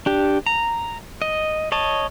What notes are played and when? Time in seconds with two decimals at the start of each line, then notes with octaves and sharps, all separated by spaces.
0.06 D4 G4
0.46 A#5
1.22 D#5
1.72 C#5 D#5 A5